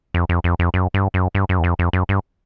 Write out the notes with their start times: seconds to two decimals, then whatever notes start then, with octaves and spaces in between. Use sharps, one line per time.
0.14 F2
0.29 F2
0.44 F2
0.59 F2
0.74 F#2
0.94 G2
1.14 F#2
1.35 G2
1.49 F#2
1.59 E2
1.64 F2
1.79 F2
1.93 F#2
2.09 G2